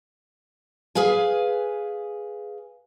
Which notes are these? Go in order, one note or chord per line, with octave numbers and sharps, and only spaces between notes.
G#4 B4 F5 G#5